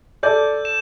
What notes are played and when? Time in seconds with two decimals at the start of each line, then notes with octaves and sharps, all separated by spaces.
0.23 A4 D5 G6
0.65 E7